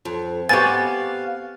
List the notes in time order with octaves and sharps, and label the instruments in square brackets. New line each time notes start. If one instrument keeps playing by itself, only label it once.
[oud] F2
[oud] B3 C4 G4 [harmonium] F5 [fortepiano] G#5 C#6 [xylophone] A6